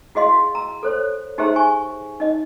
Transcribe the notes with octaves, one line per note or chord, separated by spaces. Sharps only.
E4 F#4 G#4 D#5 F5 C6
A#5
A4 C5 C#5
D#4 G4 G#4 C5 E5 A#5
G#5 C#6
D#4 D#5